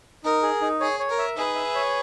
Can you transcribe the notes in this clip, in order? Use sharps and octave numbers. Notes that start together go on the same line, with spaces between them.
D#4 A#4
G#4
D#4
G#4 C#5
C#5
A#4
E5
D#4 G#4 B4
E5
C#5